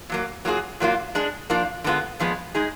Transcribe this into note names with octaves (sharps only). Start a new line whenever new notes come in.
A#2 F#3 A#3
F#3 A#3 F4 G#4
A#2 F#3 A#3 F4
G#3 D4 G#4
F3 A#3 D4 F4
D3 G#3 B3 F4
A#2 F3 G#3 B3
G#3 D#4 G#4